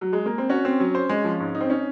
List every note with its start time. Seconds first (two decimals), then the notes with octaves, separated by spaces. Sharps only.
0.01 F#3
0.13 G#3
0.26 A#3
0.38 C4
0.49 C#4 F#4
0.65 C4
0.80 F#3
0.95 C5
1.09 G#3
1.25 F3
1.40 G#2
1.55 D#4
1.61 C4
1.70 C#4 D#4